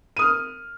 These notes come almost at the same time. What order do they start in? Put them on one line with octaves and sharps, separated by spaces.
D#7 D#6 F6